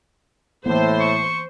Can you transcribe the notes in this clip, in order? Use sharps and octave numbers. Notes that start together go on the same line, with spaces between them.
A2 E3 A#3 B3 C5
C#6